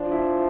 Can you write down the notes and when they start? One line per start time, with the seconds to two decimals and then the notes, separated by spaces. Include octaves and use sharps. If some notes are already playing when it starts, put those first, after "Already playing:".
Already playing: F3 D4
0.12 E4